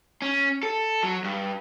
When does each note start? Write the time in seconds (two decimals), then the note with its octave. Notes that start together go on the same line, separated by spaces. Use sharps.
0.22 C#4
0.63 A4
1.03 F#3
1.24 G2